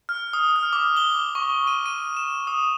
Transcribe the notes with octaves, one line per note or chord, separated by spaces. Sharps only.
F6
D#6
F6
D6
G7
C#6
D#7
D#7
E7
D#6